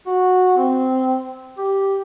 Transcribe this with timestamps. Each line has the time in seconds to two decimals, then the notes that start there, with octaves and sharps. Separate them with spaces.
0.07 F#4
0.57 C4
1.58 G4